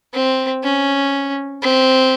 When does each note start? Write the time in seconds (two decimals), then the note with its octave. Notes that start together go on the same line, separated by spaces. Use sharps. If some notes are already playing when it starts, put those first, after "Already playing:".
0.13 C4
0.63 C#4
1.62 C4